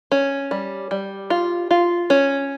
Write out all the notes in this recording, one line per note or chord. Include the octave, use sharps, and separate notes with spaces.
C#4
G3
G3
F4
F4
C#4